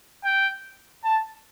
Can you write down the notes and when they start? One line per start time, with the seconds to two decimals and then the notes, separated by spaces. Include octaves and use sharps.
0.24 G5
1.04 A5